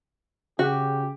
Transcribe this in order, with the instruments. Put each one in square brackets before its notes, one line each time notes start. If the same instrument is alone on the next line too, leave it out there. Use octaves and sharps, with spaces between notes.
[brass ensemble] C#3 G4 [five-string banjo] F#4